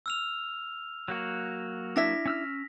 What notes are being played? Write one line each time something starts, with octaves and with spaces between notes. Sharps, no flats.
E6 F6 F7
F#3 A#3 F#4
D4 E4 E5 A#6 B6
C#4 E6 F6